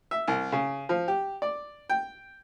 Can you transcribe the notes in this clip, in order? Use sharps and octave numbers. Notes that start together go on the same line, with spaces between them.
E5
C2
C#3
F3
G4
D5
G5